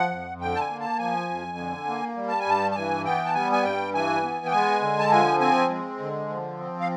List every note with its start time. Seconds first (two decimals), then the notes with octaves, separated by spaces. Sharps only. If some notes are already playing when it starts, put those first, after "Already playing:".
Already playing: F3 F#5
0.10 F2
0.41 D3 G5
0.55 A5
0.60 G#5
0.70 A#3
0.80 A5
0.98 F3 G#5
1.29 F2
1.57 D3
1.88 A#3
2.16 G3
2.28 A5
2.39 G#5
2.46 G2 A5
2.71 A5
2.76 E3 G#5
3.05 B3 G5
3.25 A5
3.34 G3 G#5
3.52 G#5
3.63 G2 G5
3.94 E3 G#5
4.23 B3
4.46 G5
4.52 G#3 G#5
4.82 D3
4.99 A5
5.11 F3 G#5
5.40 C4 G#5
5.70 G#3
6.00 D3
6.29 F3
6.59 C4
6.80 F5